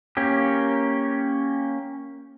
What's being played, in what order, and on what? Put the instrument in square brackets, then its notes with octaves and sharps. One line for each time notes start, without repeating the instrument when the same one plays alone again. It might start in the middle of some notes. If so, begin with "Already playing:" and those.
[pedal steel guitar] A#3 C#4 G4